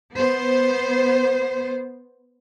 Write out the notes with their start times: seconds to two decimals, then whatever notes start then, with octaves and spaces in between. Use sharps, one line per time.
0.14 B3 C5